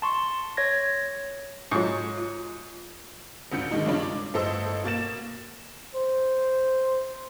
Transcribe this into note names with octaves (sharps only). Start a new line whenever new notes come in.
A5 C6 C#6
C#5 G#6 A#6
G#2 F#3 F4 C#6
F4
G#1 C#2 D3 G6 C#7
B2 D#3 G#3 D4 D#4
G2 C#3 G#3 C#4 D4 F4
D6
G1 A2 A4 C5 D#5 E6
B2 A#3 A6 E7
C5